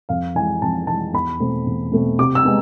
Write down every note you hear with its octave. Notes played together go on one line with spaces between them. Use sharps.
F2 F5
E3 G#3 G#5
F2 A5
E3 G#3 A5
E2 B5
B2 A3 C4
E2
B2 A3 C4
C3 D6
E6
G#3 B3